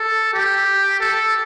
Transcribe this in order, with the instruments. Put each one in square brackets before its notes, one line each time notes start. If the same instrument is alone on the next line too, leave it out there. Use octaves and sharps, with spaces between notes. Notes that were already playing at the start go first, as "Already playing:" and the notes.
Already playing: [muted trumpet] A4
G4
A4